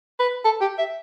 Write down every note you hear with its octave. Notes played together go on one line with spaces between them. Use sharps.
B4
A4
G4
E5